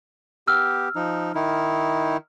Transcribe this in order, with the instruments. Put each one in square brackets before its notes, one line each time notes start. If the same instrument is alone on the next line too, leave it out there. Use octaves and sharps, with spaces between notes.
[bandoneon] B3 G4 [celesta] E6 F6
[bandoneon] F3 D#4
D#3 D#4 E4